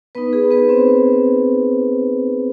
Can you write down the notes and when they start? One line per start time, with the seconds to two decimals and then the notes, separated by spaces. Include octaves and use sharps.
0.15 B3 D#4 B4
0.33 G#4
0.51 B3 B4
0.69 C4 C5